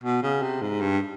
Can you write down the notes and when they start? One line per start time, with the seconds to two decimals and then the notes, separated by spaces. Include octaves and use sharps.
0.04 B2
0.23 C#3
0.42 C3
0.61 G#2
0.81 G2